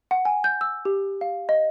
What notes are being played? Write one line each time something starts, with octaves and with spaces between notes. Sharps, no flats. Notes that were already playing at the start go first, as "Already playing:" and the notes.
F#5
G#5
G6
E6
G4
F5
D#5